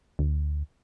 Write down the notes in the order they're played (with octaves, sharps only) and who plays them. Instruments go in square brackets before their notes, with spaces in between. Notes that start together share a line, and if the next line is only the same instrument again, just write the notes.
[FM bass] D2